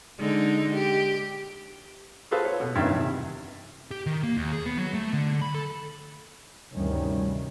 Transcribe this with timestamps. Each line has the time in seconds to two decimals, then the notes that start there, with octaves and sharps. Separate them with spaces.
0.19 D3 G#3 D#4
0.75 G4
2.31 F#4 G#4 A4 B4 C5 F5
2.45 C#5
2.60 B2
2.75 G2 C3 D#3 C#4 D#4 E5
2.90 E2 C3
3.91 G4
4.06 D#3
4.23 A#3
4.37 D#2
4.52 G#4
4.66 B3
4.78 F#3
4.94 A3
5.13 D3
5.42 B5
5.55 A4
6.73 D2 G2 C3 D#3 G3 C#4